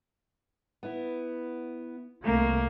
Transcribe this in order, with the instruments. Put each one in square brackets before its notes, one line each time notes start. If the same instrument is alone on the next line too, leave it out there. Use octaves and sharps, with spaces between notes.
[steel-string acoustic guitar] B3 E4
[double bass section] C2 A3 [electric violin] A#3